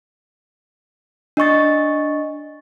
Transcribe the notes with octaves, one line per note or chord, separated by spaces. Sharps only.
D4 D#5 C#6 A6